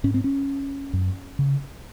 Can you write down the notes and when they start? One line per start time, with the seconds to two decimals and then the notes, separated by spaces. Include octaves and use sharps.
0.04 G#2 C#4
0.14 C4
0.24 C#4
0.93 F#2
1.39 C#3